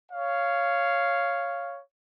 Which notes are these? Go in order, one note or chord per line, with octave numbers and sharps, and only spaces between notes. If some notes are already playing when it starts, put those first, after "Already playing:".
C#5 F5